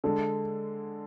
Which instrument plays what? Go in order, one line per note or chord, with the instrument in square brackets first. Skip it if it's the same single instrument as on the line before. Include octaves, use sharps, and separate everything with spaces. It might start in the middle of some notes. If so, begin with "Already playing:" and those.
[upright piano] D3 G#3 D4 [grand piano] A4